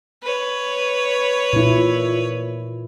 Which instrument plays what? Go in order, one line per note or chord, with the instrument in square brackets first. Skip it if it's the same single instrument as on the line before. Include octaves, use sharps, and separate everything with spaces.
[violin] B4 C#5
[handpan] A#2 E4